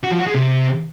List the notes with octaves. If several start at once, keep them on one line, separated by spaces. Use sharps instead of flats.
F#4
F3
F#4
G#3
C3